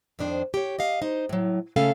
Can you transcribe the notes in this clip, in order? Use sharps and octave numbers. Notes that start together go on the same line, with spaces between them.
F2 D#3 D4 C5
G4 C#5
D#5 F5
D#4 C5
A2 F#3
C#3 A3 C#4 A4 F5